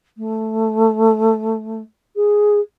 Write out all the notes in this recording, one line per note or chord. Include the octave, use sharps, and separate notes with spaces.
A3
G#4